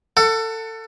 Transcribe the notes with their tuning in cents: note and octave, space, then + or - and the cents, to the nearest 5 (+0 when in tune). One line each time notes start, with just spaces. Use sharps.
A4 +25 F#5 +0